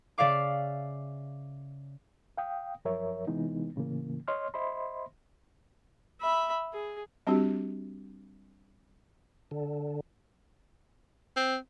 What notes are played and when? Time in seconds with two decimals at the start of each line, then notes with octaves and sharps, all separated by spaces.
0.18 C#3 D5 E5 F5 D6
2.38 F5 G5 D#6
2.85 F#2 F3 A#4 C#5 E5
3.27 C3 E3 G#3 B3 D#4
3.76 A2 C#3 E3 A#3
4.28 C#5 D#5 C6 F6
4.54 C5 D#5 E5 B5 C6
6.21 E5 B5
6.73 G#4
7.27 G3 C4 D4 F#4 G4
9.51 D3
11.36 C4